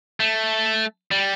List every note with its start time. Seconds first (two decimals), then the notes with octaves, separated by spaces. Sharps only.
0.20 A3
1.11 G3